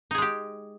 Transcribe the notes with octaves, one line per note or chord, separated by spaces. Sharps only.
G#3 D#4 G4 G#4